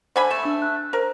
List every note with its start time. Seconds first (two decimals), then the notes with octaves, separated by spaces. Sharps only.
0.16 D3 C5 G#5 B5
0.31 A3 E7
0.43 D4 E6
0.62 F#6
0.93 A#4 C5